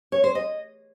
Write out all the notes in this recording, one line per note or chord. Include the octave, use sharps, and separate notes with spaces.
C#5
C5
D#5